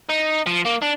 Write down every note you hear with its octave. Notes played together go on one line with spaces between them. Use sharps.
D#4
F3
A#3
D4